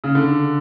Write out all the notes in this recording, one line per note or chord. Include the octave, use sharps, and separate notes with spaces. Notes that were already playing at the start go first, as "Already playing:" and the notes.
C#3
D3